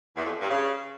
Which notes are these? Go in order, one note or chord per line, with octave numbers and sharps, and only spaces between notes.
E2
F2
G2
C#3